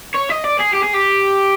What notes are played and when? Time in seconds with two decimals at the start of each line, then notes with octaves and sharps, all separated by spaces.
0.15 C#5
0.30 D#5
0.44 D5
0.59 G#4
0.73 G4
0.83 G#4
0.93 G4